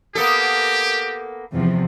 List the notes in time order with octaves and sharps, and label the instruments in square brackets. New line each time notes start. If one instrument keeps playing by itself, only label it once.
[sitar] A#3 B3 A4 [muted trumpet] G4
[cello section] E2 C3 F3